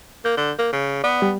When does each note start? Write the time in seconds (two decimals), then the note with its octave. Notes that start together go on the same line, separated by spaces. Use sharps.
0.25 A#3 G6
0.37 D3
0.59 A#3
0.73 C#3
1.04 B3 D5
1.22 G3